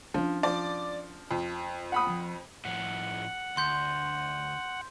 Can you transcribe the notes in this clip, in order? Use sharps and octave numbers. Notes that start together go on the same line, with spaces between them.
F3 C#4 D4
F3 D5
F2
F#5 B5 D#6
F3
A2 F3 F#5
D2 C6 G6